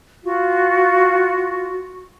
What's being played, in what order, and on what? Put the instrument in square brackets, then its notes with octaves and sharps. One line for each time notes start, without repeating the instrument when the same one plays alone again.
[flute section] F4 F#4